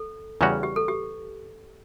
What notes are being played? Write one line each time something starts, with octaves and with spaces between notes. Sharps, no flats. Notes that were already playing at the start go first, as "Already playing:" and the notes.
Already playing: A4
E2 C#3 G3 C#4 F#4 B4
G4
A4
G4